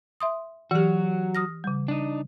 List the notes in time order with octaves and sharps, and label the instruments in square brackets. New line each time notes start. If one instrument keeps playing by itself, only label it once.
[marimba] E5 C6 D#6
[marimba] E3 G4 [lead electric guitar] F#3 F#4
[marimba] D#6 F6 A#6
C#3 G3
[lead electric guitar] D4 D#4